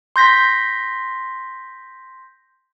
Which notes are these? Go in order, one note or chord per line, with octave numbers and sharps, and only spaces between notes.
C6 G6 A#6 B6